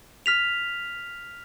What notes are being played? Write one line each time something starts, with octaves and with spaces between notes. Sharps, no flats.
F6 B6 F7